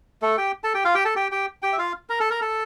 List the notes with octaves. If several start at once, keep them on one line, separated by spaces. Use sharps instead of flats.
A3 A4
G4 G5
A4 A5
G4 G5
F4 F5
G4 G5
A4 A5
G4 G5
G4 G5
G4 G5
E5
F4 F5
A#4 A#5
A4 A5
A#4 A#5
A4 A5